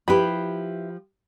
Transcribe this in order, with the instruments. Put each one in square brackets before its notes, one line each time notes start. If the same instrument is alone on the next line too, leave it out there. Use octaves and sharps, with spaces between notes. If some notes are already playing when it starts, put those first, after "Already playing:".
[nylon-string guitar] F3 G4 [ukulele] E4 B4 B5